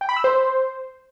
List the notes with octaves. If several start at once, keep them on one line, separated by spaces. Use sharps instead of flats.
G5
B5
E6
C5